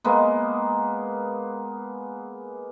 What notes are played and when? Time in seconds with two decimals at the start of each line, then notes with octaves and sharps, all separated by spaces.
0.04 G#3 A#3 B3